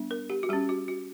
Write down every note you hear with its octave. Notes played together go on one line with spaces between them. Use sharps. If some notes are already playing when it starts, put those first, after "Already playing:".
Already playing: G3 B3 D4
A#4
G4
F#4
G3 C#4 G4
F#4
F#4